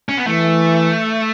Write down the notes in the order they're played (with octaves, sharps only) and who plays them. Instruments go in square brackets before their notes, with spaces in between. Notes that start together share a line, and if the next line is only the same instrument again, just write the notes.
[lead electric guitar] C#4
B3
[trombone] E3 [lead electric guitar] A3